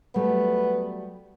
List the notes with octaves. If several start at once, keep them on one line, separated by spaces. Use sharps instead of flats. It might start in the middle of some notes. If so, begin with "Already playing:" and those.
F#3 G3 A3 B3